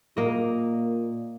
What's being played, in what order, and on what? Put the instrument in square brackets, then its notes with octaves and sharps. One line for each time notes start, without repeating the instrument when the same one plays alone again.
[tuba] A#2 [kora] A#3 D#5